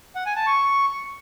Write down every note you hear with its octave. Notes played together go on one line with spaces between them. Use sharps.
F#5
G#5
A5
C#6